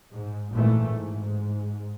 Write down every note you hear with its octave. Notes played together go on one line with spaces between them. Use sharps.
G#2
G#1 A#2 E3 A3
G#2